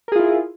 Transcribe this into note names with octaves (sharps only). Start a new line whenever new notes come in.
E4 F4 G#4 A#4